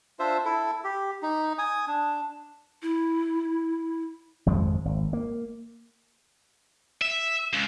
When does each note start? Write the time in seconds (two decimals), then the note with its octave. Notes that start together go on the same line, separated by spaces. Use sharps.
0.19 D4 F4 C5 E5
0.45 E4 A4
0.84 G4
1.22 D#4
1.58 G#5 D#6
1.87 D4
2.82 E4
4.46 G#1 F2 F3 G#3
4.85 G#1
5.13 A#3
7.01 E5
7.53 C#2